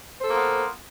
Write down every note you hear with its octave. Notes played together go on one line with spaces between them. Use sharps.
A#3 B3 F4 A4 C5